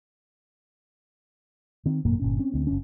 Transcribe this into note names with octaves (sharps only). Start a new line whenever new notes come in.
D#3 C4
G#1 F#2 A#2 A#3
G1 A#2 C#4
C4 C#4
D2 C4
F#1 C#4